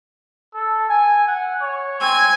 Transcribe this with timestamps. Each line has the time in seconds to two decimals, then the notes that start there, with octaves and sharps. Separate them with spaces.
0.54 A4
0.89 G#5
1.27 F#5
1.61 C#5
2.01 C4 G#5